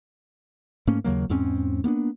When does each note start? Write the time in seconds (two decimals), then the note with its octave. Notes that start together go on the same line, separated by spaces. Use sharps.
0.87 G#2 A3 A#3 C#4
1.04 D#2 C#3 F#3 A#3
1.29 E2 G#2 C4 C#4
1.84 A#3 B3 C#4 D4